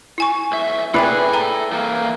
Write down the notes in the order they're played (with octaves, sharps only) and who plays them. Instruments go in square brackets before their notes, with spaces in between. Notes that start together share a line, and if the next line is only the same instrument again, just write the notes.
[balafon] E4 G#5 C#6
[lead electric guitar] B1 E5
[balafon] E4 E5 G5 [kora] G#4 B4 D5 [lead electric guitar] A4 B5
[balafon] G5 A#5
[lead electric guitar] E3 A#3